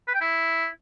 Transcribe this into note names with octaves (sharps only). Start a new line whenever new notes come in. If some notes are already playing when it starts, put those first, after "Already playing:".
B4
G5
E4